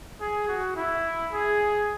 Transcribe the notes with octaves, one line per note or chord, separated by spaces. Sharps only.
G#4
F#4
E4
G#4